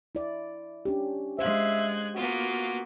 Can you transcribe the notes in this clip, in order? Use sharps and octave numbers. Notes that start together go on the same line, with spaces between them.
E4 D5
C#4 D4 G4
G#3 C5 E5 F5 F#6 G#6
A#3 B3 F4 F#4